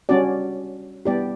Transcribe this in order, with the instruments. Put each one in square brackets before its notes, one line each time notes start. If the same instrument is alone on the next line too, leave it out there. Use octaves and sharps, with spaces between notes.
[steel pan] G3 C#4 F#4 D5
G3 B3 E4 G4 D5